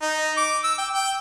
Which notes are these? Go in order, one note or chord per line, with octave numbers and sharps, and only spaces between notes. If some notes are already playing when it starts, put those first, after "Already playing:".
D#4
D6
E6
G5
G5